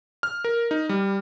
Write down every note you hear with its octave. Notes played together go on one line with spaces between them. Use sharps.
F6
A#4
D#4
G3